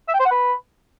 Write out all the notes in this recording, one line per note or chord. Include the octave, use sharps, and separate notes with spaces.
E5
G5
C5
F#5
B4